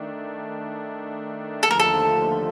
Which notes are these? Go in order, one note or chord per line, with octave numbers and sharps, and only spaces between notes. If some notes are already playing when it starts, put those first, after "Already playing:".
Already playing: D#3 A3 D4
D#2 D3 F3 A3 A4
A#4
A4